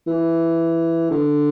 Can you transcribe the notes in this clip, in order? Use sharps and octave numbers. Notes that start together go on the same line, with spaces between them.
E3
D3